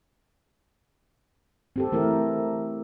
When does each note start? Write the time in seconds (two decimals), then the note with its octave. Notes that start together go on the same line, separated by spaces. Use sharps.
1.76 C4 G4 A4
1.92 E3 A3 E4 A#4